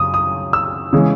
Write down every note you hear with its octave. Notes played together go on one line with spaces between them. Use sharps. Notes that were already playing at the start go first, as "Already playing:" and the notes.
Already playing: F#2 C#3 D#6
D#6
E6
C#3 E3 G#3